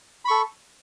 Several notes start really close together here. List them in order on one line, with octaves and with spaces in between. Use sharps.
B5 C#6 A4